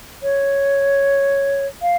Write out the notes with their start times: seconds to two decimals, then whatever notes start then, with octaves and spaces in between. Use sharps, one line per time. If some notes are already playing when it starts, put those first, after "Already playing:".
0.23 C#5
1.82 F5